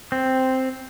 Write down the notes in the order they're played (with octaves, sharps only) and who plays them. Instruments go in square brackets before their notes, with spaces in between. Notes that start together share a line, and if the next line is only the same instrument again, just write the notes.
[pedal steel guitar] C4